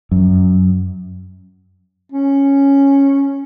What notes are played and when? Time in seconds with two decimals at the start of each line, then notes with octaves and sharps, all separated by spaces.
0.11 F#2
2.12 C#4